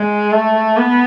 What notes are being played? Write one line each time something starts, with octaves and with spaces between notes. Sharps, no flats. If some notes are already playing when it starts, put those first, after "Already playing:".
Already playing: G#3
A3
B3